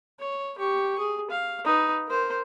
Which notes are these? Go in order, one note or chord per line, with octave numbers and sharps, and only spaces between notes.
C#5
G4 C#6
G#4
F5
D#4 B4
A#4 C5